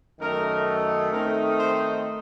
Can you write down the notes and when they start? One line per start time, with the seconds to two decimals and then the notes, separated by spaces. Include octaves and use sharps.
0.19 F#2 D#3 A3 D#4 A#4
1.11 D#3 A3 C4 D#4 A#4
1.57 C5